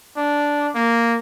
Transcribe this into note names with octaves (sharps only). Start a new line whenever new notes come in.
D4
A#3